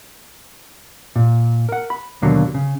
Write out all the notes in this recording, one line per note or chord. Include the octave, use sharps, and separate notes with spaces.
A#2
A#4 F#5
B5
D#2 B2 D3 F#3 A#3
C#3